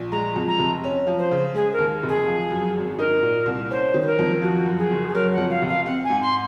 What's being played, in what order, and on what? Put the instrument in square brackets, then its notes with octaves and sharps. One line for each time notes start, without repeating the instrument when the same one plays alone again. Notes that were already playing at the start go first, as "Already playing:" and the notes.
Already playing: [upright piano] A#1
[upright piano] G#3 [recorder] A#5
[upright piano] F2
[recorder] A#5
[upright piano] F1
C#4
F3
[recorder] C5
[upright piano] C#3
[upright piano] G#3 [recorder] G#4
[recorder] A#4
[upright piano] D#2
F1
[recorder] G#4
[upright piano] F3
F#2
G#1
[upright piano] D#4 [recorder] A#4
[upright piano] A#2
C2
[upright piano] C#4 [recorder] C5
[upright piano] D#3
[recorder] C5
A#4
[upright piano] F2
[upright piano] F3 [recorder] F#4
[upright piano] F#2
[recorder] G#4
[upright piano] F#1
[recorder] G#4
[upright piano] F#3 [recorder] A#4
[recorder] F#5
[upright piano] F2
[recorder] F5
[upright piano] F1
[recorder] F5
[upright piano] C4 [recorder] F#5
[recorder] G#5
[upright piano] G#2
[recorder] C6